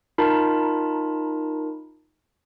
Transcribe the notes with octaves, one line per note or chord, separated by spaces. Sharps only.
D#4 F4 A#4 A5 B5